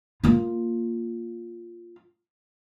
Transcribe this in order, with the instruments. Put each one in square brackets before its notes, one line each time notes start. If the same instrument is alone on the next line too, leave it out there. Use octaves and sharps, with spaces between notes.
[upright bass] A#3 F4